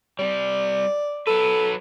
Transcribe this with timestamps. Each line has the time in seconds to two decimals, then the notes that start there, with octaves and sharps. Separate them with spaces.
0.19 G3 C4 D5
1.27 F#3 A4 B4